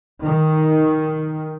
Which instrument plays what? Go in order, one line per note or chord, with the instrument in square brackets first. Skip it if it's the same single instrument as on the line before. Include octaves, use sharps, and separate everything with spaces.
[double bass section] D#3